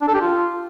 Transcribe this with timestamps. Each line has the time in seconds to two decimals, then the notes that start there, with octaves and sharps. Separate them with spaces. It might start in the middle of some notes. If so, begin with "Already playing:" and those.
0.01 D4
0.08 A4
0.14 G4
0.21 F4